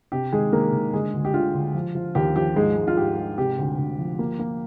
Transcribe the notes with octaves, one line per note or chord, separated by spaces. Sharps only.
C3 G4
D#3 G#3 G#4
D#3 A#3 A#4
D#3
D3 G#3 G#4
D2
G4
D3 F4
D2
F3
F3
D#2 G4
F3 G4
G#2 G#3 G#4
G#3
F4
G#2 G4
G#3
C3 G4
D2
D2
F3
A#3
A#3